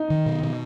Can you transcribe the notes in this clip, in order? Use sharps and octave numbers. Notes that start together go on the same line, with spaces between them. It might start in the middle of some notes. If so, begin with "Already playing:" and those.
Already playing: D#4
D#3
B2
B2